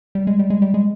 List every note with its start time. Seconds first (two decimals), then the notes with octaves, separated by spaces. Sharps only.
0.15 G3
0.27 G#3
0.39 G3
0.50 G#3
0.62 G3
0.74 G#3